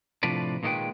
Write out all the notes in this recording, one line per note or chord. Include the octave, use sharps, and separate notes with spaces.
A2 C3 F3 D4 B4 D5
A#2 D#3 G#3 D4 B4 G5